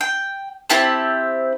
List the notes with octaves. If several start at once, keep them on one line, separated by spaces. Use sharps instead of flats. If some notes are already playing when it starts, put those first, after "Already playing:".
G5
C4 E4 G4 A5